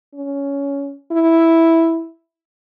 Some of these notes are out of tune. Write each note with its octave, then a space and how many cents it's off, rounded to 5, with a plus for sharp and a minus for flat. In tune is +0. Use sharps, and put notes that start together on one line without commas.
C#4 +15
E4 -5